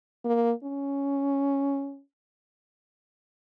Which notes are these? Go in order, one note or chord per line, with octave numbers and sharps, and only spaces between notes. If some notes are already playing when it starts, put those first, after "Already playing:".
A#3
C#4